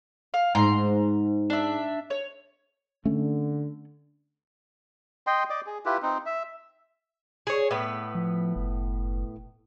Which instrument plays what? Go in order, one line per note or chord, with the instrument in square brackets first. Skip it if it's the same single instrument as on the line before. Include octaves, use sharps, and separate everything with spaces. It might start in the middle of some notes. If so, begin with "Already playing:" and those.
[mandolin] F5
[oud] G#2 [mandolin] A#5 C6
[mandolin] D4 E5
C#5
[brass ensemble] D3 [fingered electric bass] A3 C#4
[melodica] D#5 G5 C6
D5 D#5 D6
G#4
E4 F4 G4 B4
C4 D#4
E5
[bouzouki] G#4 C#5
A2 B3 B4
[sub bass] F3
F#1